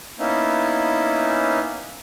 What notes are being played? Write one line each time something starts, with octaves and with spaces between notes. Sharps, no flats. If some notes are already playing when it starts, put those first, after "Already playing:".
A#3 B3 C#4 D#4 E4